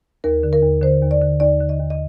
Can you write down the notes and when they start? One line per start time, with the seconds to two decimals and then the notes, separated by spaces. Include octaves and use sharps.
0.24 D#2 A#4
0.43 D3
0.53 A#4
0.63 D#2
0.82 D3 C5
1.02 D#2
1.11 D5
1.22 D3
1.40 D#2 D5
1.60 D3
1.69 D#5
1.79 D#2
1.90 D#5